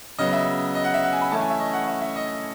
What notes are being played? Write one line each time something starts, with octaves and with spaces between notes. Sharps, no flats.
C#3 F#3 B3 D#5
E5
D#5
F#5
E5
F#5
G#5
B5
E3 A3 C#4 E4 A5
G#5
E5
D#5
F#5
E5
E5
D#5